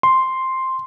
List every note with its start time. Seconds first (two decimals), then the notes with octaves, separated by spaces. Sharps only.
0.03 C6